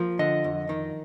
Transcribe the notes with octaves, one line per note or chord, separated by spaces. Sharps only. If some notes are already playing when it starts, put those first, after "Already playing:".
Already playing: F3 A#3
D3 D#5
F2
D#3